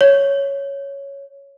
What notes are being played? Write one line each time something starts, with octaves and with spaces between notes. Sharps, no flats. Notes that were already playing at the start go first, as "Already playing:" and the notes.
C#5